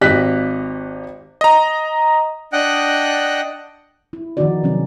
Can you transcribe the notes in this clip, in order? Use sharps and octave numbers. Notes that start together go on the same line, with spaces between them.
G#1 G4 D#5 F#6 B6
D#5 A#5
D4 D#5 F#5 G5 F#6
E4
D#3 F3 B3 D#4 F#4 D5
C3 F#3 C4 C#4